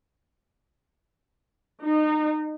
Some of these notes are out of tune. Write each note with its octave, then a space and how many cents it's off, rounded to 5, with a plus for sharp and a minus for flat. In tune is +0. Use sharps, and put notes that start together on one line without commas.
D#4 -25